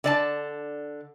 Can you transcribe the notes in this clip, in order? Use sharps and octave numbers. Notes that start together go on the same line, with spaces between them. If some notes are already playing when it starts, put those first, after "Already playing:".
D3 D5 A5